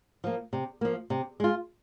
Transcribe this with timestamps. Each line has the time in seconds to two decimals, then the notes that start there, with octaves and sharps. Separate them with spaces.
0.24 F3 A#3
0.53 C3
0.81 F3 A#3
1.10 C3
1.40 G#3 F4